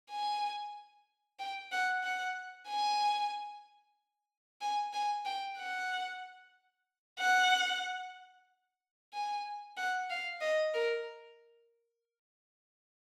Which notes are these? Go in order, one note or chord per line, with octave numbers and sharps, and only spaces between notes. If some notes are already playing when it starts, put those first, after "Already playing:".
G#5
G5
F#5
F#5
G#5
G#5
G#5
G5
F#5
F#5
G#5
F#5
F5
D#5
A#4